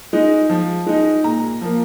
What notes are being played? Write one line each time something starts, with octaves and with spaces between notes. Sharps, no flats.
G#3 D#4
F3
G#3 D#4
A#2 A#5
F3 A#3